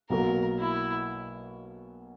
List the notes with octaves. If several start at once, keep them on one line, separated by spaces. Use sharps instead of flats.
B1 B2 F#3 A#3 A#4
E4